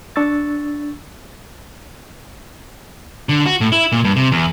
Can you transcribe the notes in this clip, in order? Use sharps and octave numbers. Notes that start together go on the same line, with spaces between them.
D4 C#6 E6 A6
D3
F#4
A2
E4
A#2
G2
C3
E2